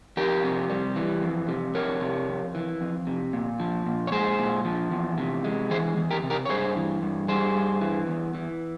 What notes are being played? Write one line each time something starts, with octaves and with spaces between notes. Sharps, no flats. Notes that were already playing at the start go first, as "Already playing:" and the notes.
F2 G4 A#4
C3
G3
E3
F2
C3
F2 A#4 C#5
C3
F2
E3
F2
C3
A#2
F3
A#2
C#5
G#3 G#4 C5
A#2
F3
E2
C3
G#3
E3 G#4 C5
E2
G4 A#4
C3
G4 A#4
C#5
G2 G#4 C5
E3
G2
G3 G#4 C5
G2
E3
E2
E3